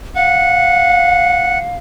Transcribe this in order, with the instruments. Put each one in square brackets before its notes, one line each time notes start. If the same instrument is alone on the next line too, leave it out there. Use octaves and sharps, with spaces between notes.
[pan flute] F5 [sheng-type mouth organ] F#5